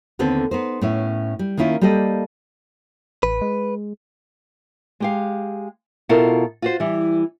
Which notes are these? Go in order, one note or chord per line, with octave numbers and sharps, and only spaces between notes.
D#2 D3 B3 C4 A4
B3 D#4 C5
A2 B3 C#4 E4 E5
G3
D#3 A#3 C#4 E4 F4
G3 A#3 G4 A4 D5 D#5
A1 B4
G#3
G#3 G4 F5
B2 E4 F4 A4 A#4
F4 F#4 C5
E3 G3